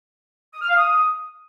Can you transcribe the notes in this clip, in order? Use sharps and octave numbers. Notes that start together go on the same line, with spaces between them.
D#6
F6
F5
D#6